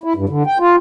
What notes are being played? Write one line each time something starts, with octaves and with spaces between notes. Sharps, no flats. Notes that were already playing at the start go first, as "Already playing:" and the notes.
E4
G2
D3
G5
F4